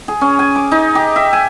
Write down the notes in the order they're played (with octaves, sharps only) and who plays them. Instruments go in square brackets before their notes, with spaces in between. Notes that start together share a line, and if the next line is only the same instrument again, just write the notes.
[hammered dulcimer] G#4
C#4
G#5
D6
D#4
G4
E5
G#5